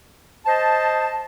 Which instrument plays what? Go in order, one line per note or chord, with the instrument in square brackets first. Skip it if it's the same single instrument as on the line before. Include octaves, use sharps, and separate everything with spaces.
[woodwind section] C5 D#5 A5